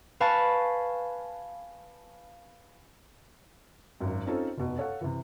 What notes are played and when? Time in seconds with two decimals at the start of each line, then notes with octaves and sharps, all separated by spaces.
0.20 B4 F5 G#5 A5 B5 C#6
4.01 G#1 F#2
4.26 C4 C#4 D#4 F4 A4 C5
4.57 F1 B2
4.78 A4 C#5 F5 F#5
5.01 C3 E3